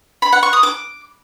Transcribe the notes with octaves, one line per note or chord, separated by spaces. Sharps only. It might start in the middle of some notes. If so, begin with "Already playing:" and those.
B5
F#5
C#6
D#6
D6